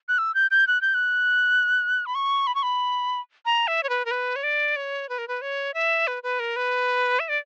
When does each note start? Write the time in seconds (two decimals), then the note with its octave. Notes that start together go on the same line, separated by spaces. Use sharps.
0.09 F#6
0.18 E6
0.35 G6
0.51 G6
0.67 F#6
0.81 G6
0.94 F#6
2.06 B5
2.15 C#6
2.47 B5
2.55 C#6
2.63 B5
3.45 A#5
3.68 E5
3.83 C#5
3.89 B4
4.05 A#4
4.11 B4
4.36 C#5
4.43 D5
4.76 C#5
5.09 B4
5.18 A#4
5.28 B4
5.42 C#5
5.74 E5
6.07 B4
6.23 B4
6.40 A#4
6.56 B4
7.20 E5
7.29 D5